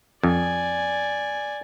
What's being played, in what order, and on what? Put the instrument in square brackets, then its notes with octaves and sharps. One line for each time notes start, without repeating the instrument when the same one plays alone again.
[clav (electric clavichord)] F2 [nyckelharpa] D5 G#5